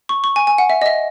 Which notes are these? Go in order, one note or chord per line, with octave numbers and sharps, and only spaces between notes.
C#6
C#6
G#5
G#5
F#5
E5
D#5
E5